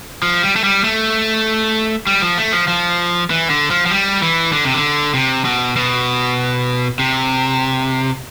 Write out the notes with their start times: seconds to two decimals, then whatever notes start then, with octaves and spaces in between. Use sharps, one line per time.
0.23 F3
0.43 G3
0.56 A3
0.64 G3
0.84 A3
2.07 G3
2.22 F3
2.38 A3
2.52 F3
2.68 F3
3.30 E3
3.50 D3
3.71 F3
3.86 F3
3.91 G3
4.22 E3
4.52 D3
4.64 C3
4.75 D3
5.14 C3
5.45 B2
5.76 B2
6.99 C3